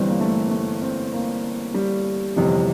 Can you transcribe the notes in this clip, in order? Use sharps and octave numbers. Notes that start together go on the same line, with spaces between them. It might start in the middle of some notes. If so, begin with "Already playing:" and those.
Already playing: G1 G2 E3 C4
A#3
A3
A3
C4
A#3
G3
G1 F2 C3 E3